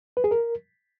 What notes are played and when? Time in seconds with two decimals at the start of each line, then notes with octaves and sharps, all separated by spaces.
0.17 B4
0.24 G#4
0.31 A#4